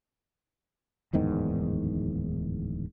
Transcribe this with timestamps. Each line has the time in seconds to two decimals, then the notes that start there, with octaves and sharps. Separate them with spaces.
1.13 D1 E2 G#2 D#3